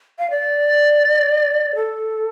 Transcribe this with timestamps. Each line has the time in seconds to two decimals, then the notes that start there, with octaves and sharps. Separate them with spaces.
0.19 F5
0.30 D5
1.75 A4